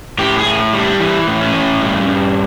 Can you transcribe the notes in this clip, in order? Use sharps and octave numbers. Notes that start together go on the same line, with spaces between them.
A2 G4
G#4
A2
G3
D4
E3
A2
C#4
A2
G2
G2